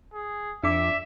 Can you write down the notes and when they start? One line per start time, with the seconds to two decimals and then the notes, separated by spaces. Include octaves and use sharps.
0.13 G#4
0.63 F2 D4 E5 D6